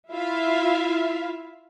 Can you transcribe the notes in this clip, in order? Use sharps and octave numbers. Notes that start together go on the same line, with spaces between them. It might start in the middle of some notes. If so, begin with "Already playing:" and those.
E4 F4 E5 F5